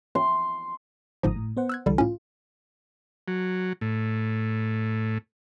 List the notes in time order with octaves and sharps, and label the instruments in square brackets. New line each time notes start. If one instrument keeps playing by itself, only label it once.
[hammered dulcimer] C6
[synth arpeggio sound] G1 G#2 F3 [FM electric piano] A#5 D#6
[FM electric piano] A2
B3 C5 F#5
[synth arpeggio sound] E6 F#6 G#6
[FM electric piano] C2 E3 A4 [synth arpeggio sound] D3 G3
[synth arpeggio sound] A2 C#4 [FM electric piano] F4
[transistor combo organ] F#3
A2